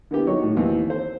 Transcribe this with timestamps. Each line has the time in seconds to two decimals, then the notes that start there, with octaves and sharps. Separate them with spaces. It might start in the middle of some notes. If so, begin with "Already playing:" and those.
0.11 D3 A#3 B3 E4 G4
0.26 D#3 F#3 D#4 C#5 C#6
0.43 A2
0.57 D#2 E3 C4
0.90 C5